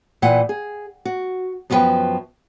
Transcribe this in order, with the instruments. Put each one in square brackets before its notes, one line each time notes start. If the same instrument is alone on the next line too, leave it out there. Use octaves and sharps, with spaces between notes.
[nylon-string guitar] A#2 E3 F#5 G5
G#4
F#4
F#2 F3 B3 F4 B4 G5